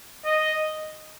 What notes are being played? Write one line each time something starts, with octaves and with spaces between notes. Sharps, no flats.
D#5